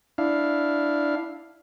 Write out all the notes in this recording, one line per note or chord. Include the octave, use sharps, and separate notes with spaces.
D4 E4 F5